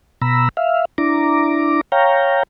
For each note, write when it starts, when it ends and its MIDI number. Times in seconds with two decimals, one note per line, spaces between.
0.22 0.49 47
0.22 0.49 82
0.22 0.49 83
0.22 0.49 88
0.57 0.85 76
0.57 0.85 77
0.98 1.81 62
0.98 1.81 64
0.98 1.81 82
0.98 1.81 86
1.92 2.43 73
1.92 2.43 77
1.92 2.43 79
1.92 2.43 82